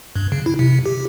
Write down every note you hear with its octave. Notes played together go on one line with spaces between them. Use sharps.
G2
C#3
E4
C3
G4